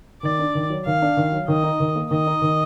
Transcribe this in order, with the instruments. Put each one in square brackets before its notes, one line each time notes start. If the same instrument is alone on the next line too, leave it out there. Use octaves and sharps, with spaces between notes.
[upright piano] D#3 [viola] D5
[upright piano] D4
D#3
F#3
[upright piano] D#3 [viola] F5
[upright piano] D4
D#3
F#3
[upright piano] D#3 [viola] D#5
[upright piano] D#4
D#3
A#3
[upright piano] D#3 [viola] D#5
[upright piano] D#4
D#3